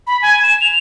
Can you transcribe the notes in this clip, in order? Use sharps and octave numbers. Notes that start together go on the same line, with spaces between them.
B5
G#5
E7
F7